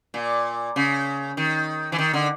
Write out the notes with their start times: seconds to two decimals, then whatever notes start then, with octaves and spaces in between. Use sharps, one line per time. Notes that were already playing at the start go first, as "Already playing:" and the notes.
0.14 A#2
0.76 C#3
1.37 D#3
1.92 E3
1.99 D#3
2.13 D3